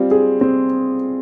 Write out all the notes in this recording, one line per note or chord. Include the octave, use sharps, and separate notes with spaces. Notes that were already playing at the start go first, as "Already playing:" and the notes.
Already playing: G3 C4 F4
G#4
C4